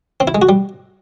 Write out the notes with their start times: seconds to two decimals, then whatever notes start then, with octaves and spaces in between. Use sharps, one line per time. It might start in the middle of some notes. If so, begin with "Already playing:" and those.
0.20 C4
0.27 E4
0.35 G#3
0.42 F#4
0.49 G3